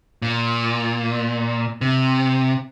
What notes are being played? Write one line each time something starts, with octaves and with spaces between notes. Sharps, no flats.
A#2
C3